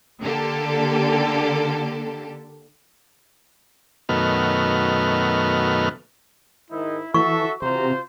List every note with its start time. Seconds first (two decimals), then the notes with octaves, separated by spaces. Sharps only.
0.22 D3 A#3 G4 A4
4.09 F#2 B2 D#3 A3 B3 F6
6.71 G#2 D#3 D#4 E4
7.14 E3 F#4 A4 E5 C#6
7.62 C3 E3 F4 F#4 C5 A#5